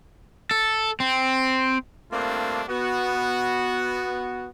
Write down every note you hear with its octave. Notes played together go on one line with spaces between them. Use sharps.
A4
C4
G2 A3 A#3 C4 D4 F4
B3 F#4